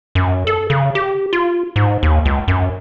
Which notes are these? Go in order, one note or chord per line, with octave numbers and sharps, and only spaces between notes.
F#2
A4
C#3
G4
F4
G#2
D#2
C#2
F#2